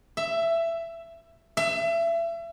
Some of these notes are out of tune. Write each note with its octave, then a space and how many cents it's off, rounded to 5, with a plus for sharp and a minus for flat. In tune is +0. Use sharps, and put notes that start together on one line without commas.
E5 +15
E5 +30